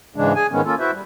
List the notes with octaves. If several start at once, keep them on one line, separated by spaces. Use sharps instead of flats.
G#2 C#3 E3 G#3 D4
G#4 G#5
G#2 D#3 G#3 B3 C#4
A#3 C#4 F4 A4
E4 F#4 B4 C5 E5
G3